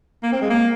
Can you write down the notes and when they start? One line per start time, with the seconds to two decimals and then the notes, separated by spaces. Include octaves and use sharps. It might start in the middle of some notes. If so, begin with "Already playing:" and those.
0.23 A#3
0.32 C4
0.41 G#3
0.50 A#3